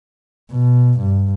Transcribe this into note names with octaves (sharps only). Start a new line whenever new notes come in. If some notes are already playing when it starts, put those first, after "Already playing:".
B2
G2